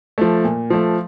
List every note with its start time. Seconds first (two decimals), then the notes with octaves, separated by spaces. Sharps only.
0.18 F3 A3
0.44 A#2
0.70 F3 A3